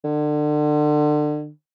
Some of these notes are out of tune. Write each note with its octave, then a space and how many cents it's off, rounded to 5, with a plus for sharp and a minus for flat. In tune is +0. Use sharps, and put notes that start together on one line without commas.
D3 +30